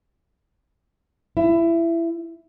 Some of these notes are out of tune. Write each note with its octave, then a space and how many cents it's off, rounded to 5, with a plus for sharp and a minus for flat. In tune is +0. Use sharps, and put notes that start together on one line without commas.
E4 +20